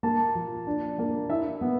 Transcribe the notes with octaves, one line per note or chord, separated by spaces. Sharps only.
A#3 A5
F3
D4
A#3
E4 E5
B3